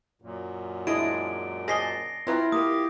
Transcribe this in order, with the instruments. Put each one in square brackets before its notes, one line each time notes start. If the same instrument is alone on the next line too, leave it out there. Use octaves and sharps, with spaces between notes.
[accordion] F#2 A#2
[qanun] G#3 D4 G#4 [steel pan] E4 D#5 [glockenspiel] D7
[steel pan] G#4 C5 D#5 [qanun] A5 D6 [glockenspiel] A#6 C7 G7
[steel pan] C4 B4 A#5 [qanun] E4 F4
[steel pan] A#3 A#4 [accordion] G4 [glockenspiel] D#6